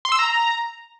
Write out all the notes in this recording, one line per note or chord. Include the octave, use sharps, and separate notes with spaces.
C6
E6
A#5